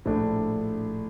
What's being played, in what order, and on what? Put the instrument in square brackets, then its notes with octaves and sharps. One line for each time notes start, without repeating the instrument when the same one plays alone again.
[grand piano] A#1 A2 A3 D4